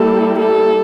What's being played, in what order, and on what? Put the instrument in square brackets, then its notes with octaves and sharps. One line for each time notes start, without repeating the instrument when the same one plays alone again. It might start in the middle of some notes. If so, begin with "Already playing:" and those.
Already playing: [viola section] G3 A#3 E4 G4 [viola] A4
[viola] A4